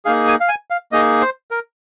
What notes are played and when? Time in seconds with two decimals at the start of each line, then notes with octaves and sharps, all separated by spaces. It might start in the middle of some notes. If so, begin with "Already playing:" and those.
0.05 A#3 D#4 G#4 F5
0.28 G#5
0.40 F5
0.48 G#5
0.70 F5
0.92 A#3 D#4 G#4 D#5
1.21 C5
1.51 A#4